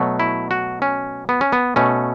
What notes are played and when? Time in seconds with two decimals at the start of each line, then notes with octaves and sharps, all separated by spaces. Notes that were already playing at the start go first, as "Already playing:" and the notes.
Already playing: B2 F#3 A3
0.20 E4
0.51 F#4
0.82 C#4
1.29 B3
1.41 C#4
1.52 B3
1.76 B2 A3 C#4